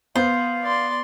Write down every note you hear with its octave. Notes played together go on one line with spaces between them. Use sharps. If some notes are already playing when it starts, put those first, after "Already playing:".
B3 C5 F5
D5 C6